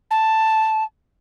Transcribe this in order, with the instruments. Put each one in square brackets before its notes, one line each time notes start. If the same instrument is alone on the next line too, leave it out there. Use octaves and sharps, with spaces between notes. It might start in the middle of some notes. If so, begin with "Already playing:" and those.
[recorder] A5